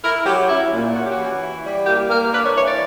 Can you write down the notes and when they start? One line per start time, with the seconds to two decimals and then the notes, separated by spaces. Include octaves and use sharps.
0.03 E4 A#4
0.26 F#3 G4
0.49 C#4 E4
0.73 A#2
0.94 C#4 F#4
1.04 G4
1.11 F#4
1.17 E3
1.41 E4
1.64 G3
1.86 A#3 G4
2.09 A#3 A#4
2.33 D4 B4
2.44 C#5
2.55 E3 C#5
2.67 D5